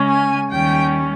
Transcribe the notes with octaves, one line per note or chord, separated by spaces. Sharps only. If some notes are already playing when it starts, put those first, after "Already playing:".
Already playing: C#3 G#3 C#4
G#5
D#2 D#3 G3 C#4 G5